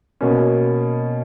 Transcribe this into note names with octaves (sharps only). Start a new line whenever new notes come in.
B2 A#3 C#4